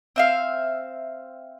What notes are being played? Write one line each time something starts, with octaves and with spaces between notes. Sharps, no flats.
C4 E5 F5